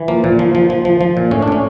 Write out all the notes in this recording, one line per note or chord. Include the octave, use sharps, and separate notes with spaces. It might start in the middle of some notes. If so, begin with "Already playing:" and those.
Already playing: E3
F3 A#3
A#2
F3
F3
F3
F3
F3
A#2
A2 C#4
D4
A2 C#4